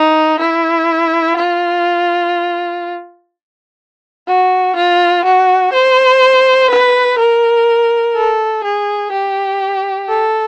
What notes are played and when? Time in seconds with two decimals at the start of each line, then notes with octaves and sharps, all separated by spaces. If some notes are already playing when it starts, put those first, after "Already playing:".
Already playing: D#4
0.40 E4
1.37 F4
4.28 F#4
4.76 F4
5.25 F#4
5.73 C5
6.70 B4
7.19 A#4
8.15 A4
8.64 G#4
9.12 G4
10.09 A4